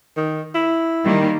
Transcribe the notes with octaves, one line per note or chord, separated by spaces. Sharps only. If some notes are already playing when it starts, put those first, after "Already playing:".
D#3
E4
D#3 G3 A#3